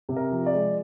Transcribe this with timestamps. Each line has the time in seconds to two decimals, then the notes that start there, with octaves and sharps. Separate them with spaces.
0.09 C3
0.16 A#4
0.32 F3
0.46 D5
0.53 G#3